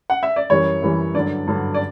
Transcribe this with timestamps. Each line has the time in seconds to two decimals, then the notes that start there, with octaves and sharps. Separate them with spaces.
0.10 F#5
0.23 E5
0.36 D5
0.50 F#2 E3 G3 C#5
0.82 F#2 E3 G3
1.14 G2 D3 F#3 D5
1.47 G2 D3 F#3
1.74 D5